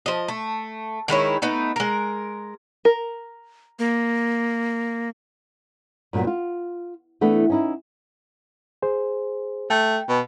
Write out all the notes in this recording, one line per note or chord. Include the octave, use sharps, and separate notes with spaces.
F3 D#5
A3
D#3 G#3 E4 C#5
A3 B3 D#4
G#3 A#4
A#4
A#3
G2 A#2 F3 F#3 B3
F4
E3 A3 B3 D4
C#4 D#4 E4
G#4 C5
A3 G5
B2